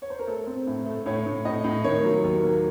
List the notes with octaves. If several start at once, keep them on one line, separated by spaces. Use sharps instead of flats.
C#5
C5
A#4
A3 A4
C4
A2
A3
A2 C#5
A2
A2 D#5
A2
D#3 C#5
F#3
D#2
A#3